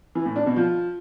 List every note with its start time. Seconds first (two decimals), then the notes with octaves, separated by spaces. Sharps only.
0.15 E3
0.26 A2
0.36 D4
0.46 B2
0.56 F3